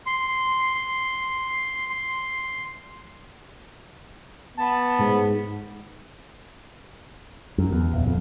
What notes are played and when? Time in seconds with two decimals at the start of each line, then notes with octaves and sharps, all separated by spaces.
0.06 C6
1.90 C6
4.57 B3 A5
4.99 G#2
7.58 F#2
7.72 E2
7.93 D#1
8.07 F2